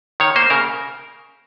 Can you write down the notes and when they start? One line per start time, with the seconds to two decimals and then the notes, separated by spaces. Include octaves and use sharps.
0.20 D#3 C#5
0.36 A#3 C5
0.50 C#3 A#4